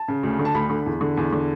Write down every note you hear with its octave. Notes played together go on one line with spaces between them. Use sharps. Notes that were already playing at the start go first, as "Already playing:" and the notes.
Already playing: A5
C#3
D2
D3
A5
D2 B5
D3
E2
D3
E2
D3